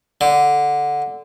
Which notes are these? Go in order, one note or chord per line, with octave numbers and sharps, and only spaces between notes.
D3